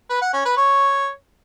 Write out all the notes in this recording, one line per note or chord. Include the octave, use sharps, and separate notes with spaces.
B4
F#5
C#4
B4
C#5